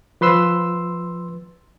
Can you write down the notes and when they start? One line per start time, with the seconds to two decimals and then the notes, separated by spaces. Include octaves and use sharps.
0.21 F3 B4 C6 E6